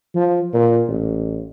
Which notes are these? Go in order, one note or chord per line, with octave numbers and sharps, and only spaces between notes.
F3
A#2
A1